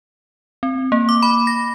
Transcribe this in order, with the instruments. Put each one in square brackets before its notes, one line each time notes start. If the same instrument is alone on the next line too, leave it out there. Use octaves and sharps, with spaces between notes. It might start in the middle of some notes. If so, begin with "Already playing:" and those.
[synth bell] C4
A#3
D6
B5
A#6